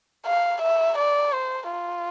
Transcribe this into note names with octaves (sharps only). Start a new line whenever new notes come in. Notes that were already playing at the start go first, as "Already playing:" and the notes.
F5
E5
D5
C5
F4